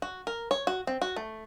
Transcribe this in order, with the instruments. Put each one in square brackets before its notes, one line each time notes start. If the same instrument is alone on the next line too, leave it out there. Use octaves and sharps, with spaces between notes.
[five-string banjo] F#4
A#4
C#5
F#4
C4
F#4
A3